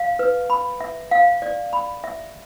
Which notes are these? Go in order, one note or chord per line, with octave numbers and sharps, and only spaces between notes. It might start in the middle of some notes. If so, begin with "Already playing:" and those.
Already playing: F5
B4
B5
E5
F5
D5
B5
E5